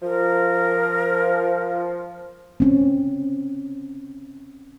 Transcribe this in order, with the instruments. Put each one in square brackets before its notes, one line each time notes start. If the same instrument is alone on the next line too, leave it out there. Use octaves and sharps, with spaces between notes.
[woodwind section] F3 [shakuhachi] A#4
[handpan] C4 C#4